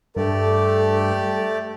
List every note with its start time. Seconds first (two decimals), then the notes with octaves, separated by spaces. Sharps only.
0.16 G2 A3 G4 A4 D5